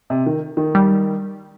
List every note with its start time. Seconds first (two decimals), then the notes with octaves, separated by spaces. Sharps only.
0.10 C3
0.26 D#3
0.57 D#3
0.75 G3